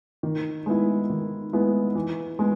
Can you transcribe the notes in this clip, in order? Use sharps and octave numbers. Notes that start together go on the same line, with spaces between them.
D#3
G#3 B3 E4
D#3
G#3 B3 E4
E3
G#3 B3